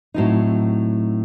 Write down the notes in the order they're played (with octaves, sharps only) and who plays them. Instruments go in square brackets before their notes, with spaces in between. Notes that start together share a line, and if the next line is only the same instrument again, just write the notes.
[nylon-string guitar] A2 F#3 C4 D#4